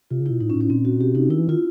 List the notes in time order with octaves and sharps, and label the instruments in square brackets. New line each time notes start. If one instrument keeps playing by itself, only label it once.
[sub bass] C3 [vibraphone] F4
[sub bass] C#3
[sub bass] B2 [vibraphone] E4
[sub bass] A2 [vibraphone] D#4
[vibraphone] C#4
[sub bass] A2
[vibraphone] C#4
[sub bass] A#2 [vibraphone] C4
[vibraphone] F#4
[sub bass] B2 [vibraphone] G4
[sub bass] C3 [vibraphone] D#4
[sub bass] D#3 [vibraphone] E4
[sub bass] E3
[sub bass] D#3 [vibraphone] F4